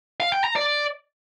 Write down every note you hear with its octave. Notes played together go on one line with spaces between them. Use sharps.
F5
G5
A#5
D5